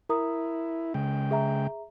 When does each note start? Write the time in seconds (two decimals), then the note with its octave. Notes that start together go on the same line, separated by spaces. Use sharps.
0.09 E4 A#4 A#5 D#6
0.94 C#3 G#3 G5
1.31 G#4 E5 A#5